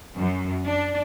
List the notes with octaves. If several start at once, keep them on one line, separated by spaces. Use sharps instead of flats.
F#2
D4